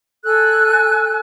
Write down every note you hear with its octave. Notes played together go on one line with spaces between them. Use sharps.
A4 G#5 E6 F#6